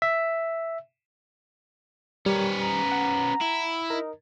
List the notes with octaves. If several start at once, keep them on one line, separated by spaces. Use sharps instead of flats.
E5
G3 B3 C#4 A#4
A#5
F#5
E4
D#4 A#4